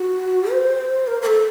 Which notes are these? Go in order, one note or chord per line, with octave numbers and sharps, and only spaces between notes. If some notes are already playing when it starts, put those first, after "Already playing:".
Already playing: F#4
C5
A#4
A#4
A4